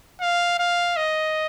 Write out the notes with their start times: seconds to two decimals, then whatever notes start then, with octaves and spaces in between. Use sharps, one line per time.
0.21 F5
0.59 F5
0.96 D#5